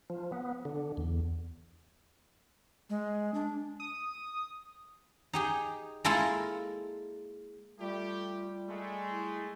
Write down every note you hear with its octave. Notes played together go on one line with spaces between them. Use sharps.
F3
B3
D3
E2
G#3
D4
D#6
D#4 G4 G#4
G#3 A#3 E4 F4 A4
G3 A3 F4 G4
G#3 A3
E4